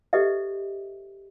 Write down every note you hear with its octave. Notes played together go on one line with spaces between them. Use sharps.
G4 A4 B4 D#5 E5